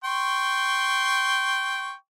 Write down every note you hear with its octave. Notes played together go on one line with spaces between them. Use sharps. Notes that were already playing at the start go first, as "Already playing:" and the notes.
G5 C6 C#6